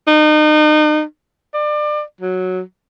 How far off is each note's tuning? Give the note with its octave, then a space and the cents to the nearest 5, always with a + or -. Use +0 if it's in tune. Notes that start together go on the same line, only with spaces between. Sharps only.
D#4 -35
D5 +30
F#3 -5